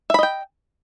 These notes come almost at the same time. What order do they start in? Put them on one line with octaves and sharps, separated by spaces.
E5 B5 D#5 G5